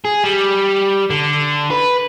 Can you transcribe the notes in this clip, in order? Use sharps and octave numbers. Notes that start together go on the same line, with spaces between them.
G#4
G3
D3
B4